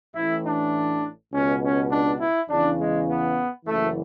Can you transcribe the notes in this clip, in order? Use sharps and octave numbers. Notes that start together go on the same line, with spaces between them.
A1 A2 E3 E4
D4
C#2 B2 C#4
C#4
D4
E4
E2 C#3 E3 D4
G#3
B3
F#1 F#2 E3 A3